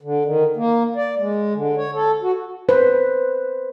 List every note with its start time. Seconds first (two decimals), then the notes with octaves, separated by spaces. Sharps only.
0.02 D3
0.25 D#3
0.56 A#3
0.96 D5
1.18 G#3
1.54 D3
1.77 C#5
1.95 A4
2.22 F#4
2.69 B4 C5